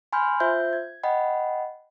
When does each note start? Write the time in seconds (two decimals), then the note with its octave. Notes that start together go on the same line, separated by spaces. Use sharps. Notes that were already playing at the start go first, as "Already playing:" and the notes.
0.13 G#5 B5 C6 F6 G6
0.40 F4 C5 E5 G6
0.73 G#6
1.03 D#5 F#5 G5 B5